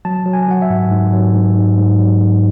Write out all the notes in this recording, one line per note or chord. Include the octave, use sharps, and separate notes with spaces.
F#3 A5
F#3
G#5
F#3 F#5
E5
G#2
G#2
F#3
G#2
G#2
G#2
F#3
G#2